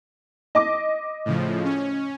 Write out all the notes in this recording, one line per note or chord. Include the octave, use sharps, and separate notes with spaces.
D#5 D6
A2 C#3 F3
C#4